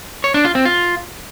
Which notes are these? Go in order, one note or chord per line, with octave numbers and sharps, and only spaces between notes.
C#5
D4
F4
C4
F4